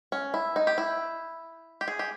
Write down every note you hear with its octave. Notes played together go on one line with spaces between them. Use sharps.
C#4
E4
D#4
G4
E4
G4
G#4
G4